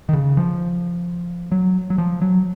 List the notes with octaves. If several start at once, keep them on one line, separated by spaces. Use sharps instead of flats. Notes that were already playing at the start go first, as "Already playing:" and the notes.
D#3
C#3
F3
F#3
F#3
F3
F#3